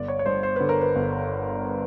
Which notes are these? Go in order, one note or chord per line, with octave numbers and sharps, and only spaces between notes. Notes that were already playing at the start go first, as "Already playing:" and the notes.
Already playing: G1 D5
C#5
C#5
G2 C5
C5
D3 B4
A#4
B4
G1